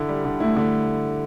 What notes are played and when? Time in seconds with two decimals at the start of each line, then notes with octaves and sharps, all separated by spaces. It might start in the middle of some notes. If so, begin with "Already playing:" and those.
Already playing: D3 E4
0.09 G3
0.25 D3
0.40 A3 E4
0.56 D3